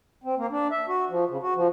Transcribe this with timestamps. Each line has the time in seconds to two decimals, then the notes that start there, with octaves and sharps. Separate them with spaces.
0.24 C4
0.38 A#3
0.51 D4
0.71 E5
0.88 F#4
1.10 F3
1.29 C#3
1.42 F#4
1.56 F3